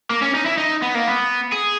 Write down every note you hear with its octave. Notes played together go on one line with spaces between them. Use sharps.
A#3
C#4
D#4
E4
D#4
B3
A#3
B3
G#4